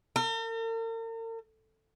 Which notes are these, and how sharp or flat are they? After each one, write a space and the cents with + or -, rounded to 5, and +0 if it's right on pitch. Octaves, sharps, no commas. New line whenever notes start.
A#4 -45